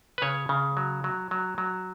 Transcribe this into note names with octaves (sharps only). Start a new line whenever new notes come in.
B4
C#3 C#5
C#3
F#3
F#3
F#3
F#3